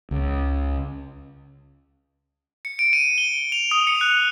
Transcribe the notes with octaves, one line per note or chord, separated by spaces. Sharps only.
C#2
C#7
D7
D#7
G7
F7
D#6
C#7
F#6